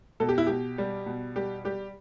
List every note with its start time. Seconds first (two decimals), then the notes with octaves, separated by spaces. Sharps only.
0.20 B2 A4
0.29 G4
0.38 E4
0.47 B2 G4
0.78 G3
1.06 B2
1.36 G3 G4
1.65 G3 G4